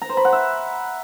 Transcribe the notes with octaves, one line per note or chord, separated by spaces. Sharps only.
A#5
C5
B5
F#5
E5